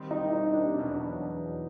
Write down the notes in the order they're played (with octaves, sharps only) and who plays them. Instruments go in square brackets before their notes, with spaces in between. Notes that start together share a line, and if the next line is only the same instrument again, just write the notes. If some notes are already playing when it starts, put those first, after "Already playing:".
Already playing: [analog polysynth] D#3 G3 C4
[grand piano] D#4
E4
D#4
D4
[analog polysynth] E2 B2 F#3 [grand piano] D4